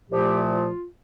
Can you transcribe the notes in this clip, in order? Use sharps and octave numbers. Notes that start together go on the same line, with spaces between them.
C2 A#2 F3 A3 G4
F4